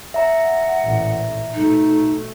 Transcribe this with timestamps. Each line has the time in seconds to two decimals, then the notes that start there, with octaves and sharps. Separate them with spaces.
0.14 E5 F#5 A#5
0.80 A1 A#2
1.54 B2 A3 D#4